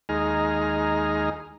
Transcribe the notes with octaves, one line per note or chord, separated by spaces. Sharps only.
D#2 G#3 D#4 G#4 A#5 F6